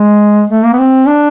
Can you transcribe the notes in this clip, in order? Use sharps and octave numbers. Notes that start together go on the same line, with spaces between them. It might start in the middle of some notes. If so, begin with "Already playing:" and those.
Already playing: G#3
A3
A#3
B3
C4
D4